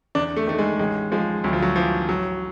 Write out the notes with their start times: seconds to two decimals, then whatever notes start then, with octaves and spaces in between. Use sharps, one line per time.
0.15 E2 D4
0.36 A3
0.47 D#3 A3
0.59 G#3
0.79 A1 G#3
1.12 F3 G#3
1.44 D2 F#3
1.53 F3
1.62 F#3
1.76 E3 F3
2.09 A1 F#3